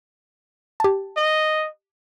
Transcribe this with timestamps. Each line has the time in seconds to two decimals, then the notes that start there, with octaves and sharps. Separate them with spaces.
0.80 G4 A5
1.17 D#5